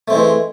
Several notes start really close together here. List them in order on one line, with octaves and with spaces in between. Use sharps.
A3 C4 G#3 E3